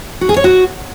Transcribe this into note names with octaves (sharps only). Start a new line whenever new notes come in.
F#4
G#4
C#5
F#4